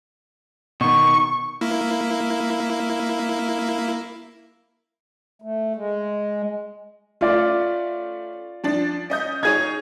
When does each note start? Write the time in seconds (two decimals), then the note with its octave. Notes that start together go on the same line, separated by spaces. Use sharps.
0.81 B2 D#3 C#6
1.61 A#3 E4
5.42 A3
5.76 G#3
7.21 A3 C#4 F4 D5
8.64 F3 D4 A6
9.10 C#4 D#5 G6
9.43 D#4 G#4 C#5 G#6